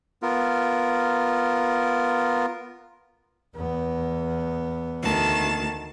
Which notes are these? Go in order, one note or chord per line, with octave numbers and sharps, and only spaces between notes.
B3 F4 A#4
E2 B3
D2 D#3 A5